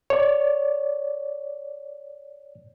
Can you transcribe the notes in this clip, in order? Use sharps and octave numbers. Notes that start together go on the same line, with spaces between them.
C#5 D5